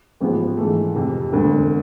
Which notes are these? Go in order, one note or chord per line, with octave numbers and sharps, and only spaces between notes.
A1 G#2 F3 B3
G#2 E3 A3
F1 F2 C3
E1 D2 D3